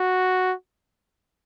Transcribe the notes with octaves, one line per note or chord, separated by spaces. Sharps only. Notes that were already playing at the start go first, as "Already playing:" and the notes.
Already playing: F#4